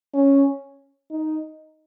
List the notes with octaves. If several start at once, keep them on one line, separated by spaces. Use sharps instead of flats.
C#4
D#4